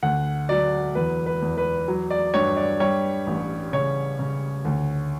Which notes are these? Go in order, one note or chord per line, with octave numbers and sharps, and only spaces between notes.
D2 F#5
F#3 D5
E2 B4
B4
E2
B4
F#3
D5
G2 C#5
D5
G3 C#5
A1
C#3 C#5
C#3
D2